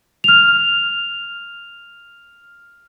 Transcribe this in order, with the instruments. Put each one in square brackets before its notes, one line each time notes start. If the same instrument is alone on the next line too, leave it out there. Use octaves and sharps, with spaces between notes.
[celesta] F6 F7